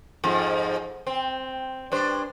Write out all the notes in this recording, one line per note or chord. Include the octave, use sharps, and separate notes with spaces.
F2 G#2 F3
C4
G2 D4 C5